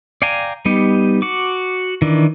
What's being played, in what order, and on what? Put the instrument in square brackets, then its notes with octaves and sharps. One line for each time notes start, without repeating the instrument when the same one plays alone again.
[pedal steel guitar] D5 F5 G5 G#5 A#5
G3 B3 D#4 G4
F#4 D6
D#3 E3 D4